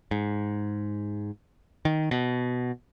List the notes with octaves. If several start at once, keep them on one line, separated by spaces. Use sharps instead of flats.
G#2
D#3
B2